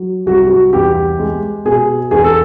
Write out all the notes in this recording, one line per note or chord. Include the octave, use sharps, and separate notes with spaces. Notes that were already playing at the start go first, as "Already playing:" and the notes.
Already playing: F#3
C2 F#4
F#4
E2 G4
G#3
B2 G#4
E2 G#4
A4